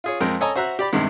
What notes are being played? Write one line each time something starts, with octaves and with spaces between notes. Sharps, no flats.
F4 G#4 C#5
F2 G#3 A#4 G5
A4 C#5 D#5 G#5 A#5
F#4 C5 E5 A#5 F#6
G4 D5 B5
E2 G2 C3 D#3 G#3